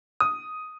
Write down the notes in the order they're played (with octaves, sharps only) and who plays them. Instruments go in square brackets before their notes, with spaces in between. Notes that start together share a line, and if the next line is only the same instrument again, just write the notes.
[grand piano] D#6